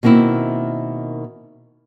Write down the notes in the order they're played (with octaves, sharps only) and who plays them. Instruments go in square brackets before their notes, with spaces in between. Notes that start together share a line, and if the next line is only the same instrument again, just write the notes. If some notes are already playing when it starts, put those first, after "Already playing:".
[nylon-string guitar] B2 D#3 A#3 C4 E4